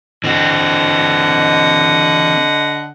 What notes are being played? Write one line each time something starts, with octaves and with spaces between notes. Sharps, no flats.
D3 E3 C4 D#5 F#5